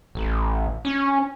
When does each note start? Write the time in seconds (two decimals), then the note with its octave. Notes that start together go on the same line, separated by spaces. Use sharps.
0.15 A1
0.85 C#4